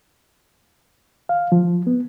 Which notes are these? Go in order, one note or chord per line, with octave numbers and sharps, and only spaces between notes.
F5
F3
B3